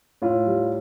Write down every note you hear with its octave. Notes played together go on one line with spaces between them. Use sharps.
A2 F4
G3